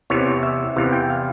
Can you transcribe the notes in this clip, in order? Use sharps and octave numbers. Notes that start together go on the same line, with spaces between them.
E2 C3 E3 C#5
E5
E2 C3 E3 F5
G5
F5